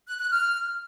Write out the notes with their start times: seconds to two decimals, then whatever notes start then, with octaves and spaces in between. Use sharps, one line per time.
0.07 F#6
0.19 F#6
0.31 F6